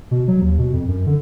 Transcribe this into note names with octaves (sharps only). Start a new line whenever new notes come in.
B2
F#3
D#2
B2
F2
F#2
D3